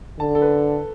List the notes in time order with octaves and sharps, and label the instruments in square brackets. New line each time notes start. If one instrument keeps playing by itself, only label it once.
[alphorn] D3 [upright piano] A5
[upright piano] A4
B4